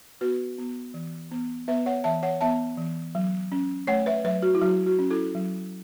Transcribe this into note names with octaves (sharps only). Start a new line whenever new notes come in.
B3 F#4 B4
B3
E3
B3
B3 B4 E5
C#5 F#5
E3 E5 A5
C#5 F#5
B3 E5 A5
E3
F#3
C#4
A3 C#5 F#5
B4 E5
F#3 B4 E5
F#4
E4
F#3 F#4
F#4
C#4
E4 A4
F#3